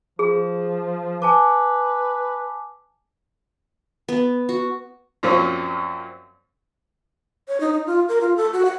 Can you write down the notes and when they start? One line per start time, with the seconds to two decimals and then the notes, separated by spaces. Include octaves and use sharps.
0.19 F3 G#4
1.22 B4 G#5 A5 D6
4.09 B3
4.49 F#4
5.23 F#2 A#2 F3 C4 C#4
7.48 C#5
7.60 D#4
7.73 D#4
7.86 F4
8.09 A#4
8.21 F4
8.37 A4
8.53 F#4
8.65 F#5